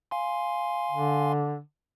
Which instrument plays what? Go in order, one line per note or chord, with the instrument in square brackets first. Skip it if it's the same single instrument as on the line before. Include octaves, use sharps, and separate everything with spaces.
[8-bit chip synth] F5 G#5 C6
[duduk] D3